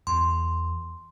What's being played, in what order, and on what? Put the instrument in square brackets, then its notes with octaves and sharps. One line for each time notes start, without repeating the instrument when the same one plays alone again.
[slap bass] E2 [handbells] C6